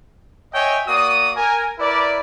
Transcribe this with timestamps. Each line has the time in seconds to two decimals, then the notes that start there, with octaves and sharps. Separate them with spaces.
0.54 C#5 D#5 E5 G5 G#5
0.87 A#3 F#4 D5 D#6
1.36 A#4 G#5
1.79 E4 A#4 B4 D5